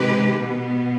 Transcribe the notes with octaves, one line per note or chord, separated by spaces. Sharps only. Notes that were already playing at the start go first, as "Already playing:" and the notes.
Already playing: C3 D#3 G#3 G4 B4
B2 B3